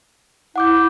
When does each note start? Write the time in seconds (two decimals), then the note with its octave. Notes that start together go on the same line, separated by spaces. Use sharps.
0.56 E4 F#5 D6 G6